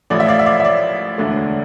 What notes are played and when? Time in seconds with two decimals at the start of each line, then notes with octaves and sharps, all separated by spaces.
0.10 A1 A2 F3 A3 D5
0.20 E5
0.29 D5 F5
0.39 E5
0.46 D5 F5
0.60 E5
0.65 D5
1.18 E1 D2 D3 A3